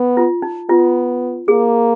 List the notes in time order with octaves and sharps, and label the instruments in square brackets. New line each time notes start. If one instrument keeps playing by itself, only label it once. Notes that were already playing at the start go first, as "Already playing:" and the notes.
Already playing: [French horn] B3
[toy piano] F4
D#4
[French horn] B3 [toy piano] F4
[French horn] A#3 [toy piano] G#4